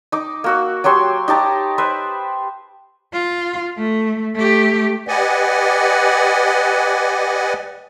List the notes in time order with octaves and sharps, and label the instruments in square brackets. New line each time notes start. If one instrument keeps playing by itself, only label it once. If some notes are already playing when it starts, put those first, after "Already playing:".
[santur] D#4 D6
A#3 F#4 E6
F#3 G4 C#5 C6
D#4 G4 A5 A#5
B4 C5 E5
[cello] F4
A3
A3 G4
[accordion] G4 B4 D5 D#5 F#5 G#5